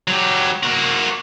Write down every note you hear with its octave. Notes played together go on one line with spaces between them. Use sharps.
F#3 G4
A#3 F#4